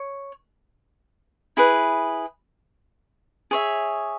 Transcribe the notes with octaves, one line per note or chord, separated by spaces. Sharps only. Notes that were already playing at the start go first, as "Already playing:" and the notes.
Already playing: C#5
E4 G#4 B4
G#4 C#5 E5